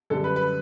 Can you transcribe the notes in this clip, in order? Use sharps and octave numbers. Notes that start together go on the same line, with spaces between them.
F#2 D3 G3 A4
B4
B4